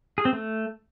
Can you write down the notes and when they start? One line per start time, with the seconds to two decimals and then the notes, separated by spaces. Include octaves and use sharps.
0.18 G#4
0.25 C4
0.33 A3